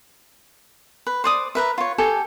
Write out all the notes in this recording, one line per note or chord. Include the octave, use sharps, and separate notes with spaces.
B4
C5 D5 D#6
A#4 B4 E5
F4 C#5
G4 A4 G#5